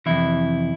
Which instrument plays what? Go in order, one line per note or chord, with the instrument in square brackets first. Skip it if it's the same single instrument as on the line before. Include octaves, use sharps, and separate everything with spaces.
[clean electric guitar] F2 C3 E3 E4